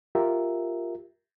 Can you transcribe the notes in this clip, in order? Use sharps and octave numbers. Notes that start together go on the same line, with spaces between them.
F4 G4 A#4 E5